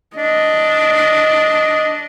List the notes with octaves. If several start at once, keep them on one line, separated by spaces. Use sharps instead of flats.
D4 D#5